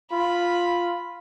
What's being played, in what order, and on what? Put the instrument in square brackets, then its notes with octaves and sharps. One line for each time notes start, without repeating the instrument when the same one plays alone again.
[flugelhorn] F4 [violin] B5